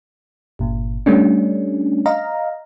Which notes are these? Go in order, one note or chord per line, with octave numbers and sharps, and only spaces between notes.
G1 A#2
G3 A3 C#4 D4
D#5 F5 A#5